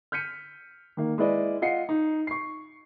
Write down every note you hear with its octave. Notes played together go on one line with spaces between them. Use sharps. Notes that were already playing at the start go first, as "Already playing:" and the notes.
F6 G6 B6 C#7 D#7
D#3 A#3
G#3 E4 B4 D5 D#5
F4 D#5 F#5 C7 C#7
D#4
C#6 C7